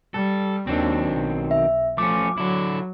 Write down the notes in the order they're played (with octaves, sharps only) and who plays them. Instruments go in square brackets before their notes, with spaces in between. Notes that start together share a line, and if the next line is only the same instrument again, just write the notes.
[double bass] G3 [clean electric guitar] A4
[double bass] D#2 D4 [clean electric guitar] D#3 F#3 C4
[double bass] B1
[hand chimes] E5
[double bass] F3 [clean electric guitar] A3 C#4 [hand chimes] D6
[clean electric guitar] D3 E4 [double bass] F#3